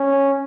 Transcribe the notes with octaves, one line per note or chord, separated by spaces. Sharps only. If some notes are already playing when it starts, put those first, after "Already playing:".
Already playing: C#4